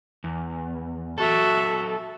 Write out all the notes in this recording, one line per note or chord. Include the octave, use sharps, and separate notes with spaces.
E2
F#3 F#4 A4 E5